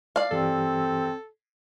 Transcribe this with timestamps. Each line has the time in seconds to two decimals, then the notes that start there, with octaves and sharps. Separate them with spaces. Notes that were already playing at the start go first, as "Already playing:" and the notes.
0.16 D5 F5
0.31 G2 E3 C4 G4 A4